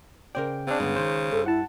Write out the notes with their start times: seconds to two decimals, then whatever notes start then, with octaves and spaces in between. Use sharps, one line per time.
0.35 C#3 A#4 C5 D5 G5
0.67 C#3 C4 D4
0.80 G2 D3 G#3 B3
0.96 D#3 G#3 C5
1.32 G2 A4
1.46 E4 F#5 A5